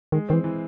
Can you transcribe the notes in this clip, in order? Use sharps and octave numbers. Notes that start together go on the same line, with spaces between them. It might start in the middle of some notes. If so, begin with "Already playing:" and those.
D#3 G#3
D#3 E3 C4
E3